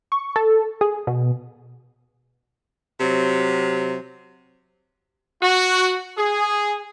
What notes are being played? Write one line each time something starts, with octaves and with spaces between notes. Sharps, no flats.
C#6
A4
G#4
B2
C3 F#3
F#4
G#4